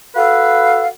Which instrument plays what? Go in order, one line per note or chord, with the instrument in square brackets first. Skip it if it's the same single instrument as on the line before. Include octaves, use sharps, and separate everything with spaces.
[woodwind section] F#4 A4 B4 F5